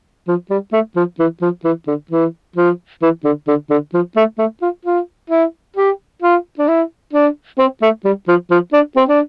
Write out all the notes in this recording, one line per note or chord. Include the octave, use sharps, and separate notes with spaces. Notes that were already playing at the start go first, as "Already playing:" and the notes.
F3
G3
A3
F3
E3
F3
E3
D3
E3
F3
E3
D3
D3
D3
F3
A3
A3
F4
F4
E4
G4
F4
D4
E4
D4
C4
A3
G3
F3
F3
D4
C4
D4